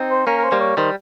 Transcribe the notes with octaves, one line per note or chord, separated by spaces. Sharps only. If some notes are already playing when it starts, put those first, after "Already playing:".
Already playing: C4 D#4
C5
A#3 C#4 A#4
A#4
C5
G3 A#3
C#5
D#3 G3 C5